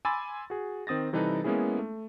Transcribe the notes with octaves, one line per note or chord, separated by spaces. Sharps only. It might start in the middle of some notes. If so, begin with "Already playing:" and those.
G#5 B5 C6 D6 E6 A6
F#4 G#4
D#3 C4 D#6 A6 A#6
C3 E3 G3 D#4 A4 B4
G#3 A#3 B3 C#4 E4 G#4
A3